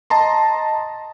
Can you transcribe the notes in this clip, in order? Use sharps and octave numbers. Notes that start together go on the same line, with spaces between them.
D#5 A5 A#5 C6